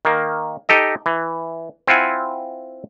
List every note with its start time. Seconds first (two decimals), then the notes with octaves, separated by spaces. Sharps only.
0.05 D#3 A#3
0.69 D#4 G4 A4 D#5
1.06 E3
1.88 C4 E4 F4 F#5 G#5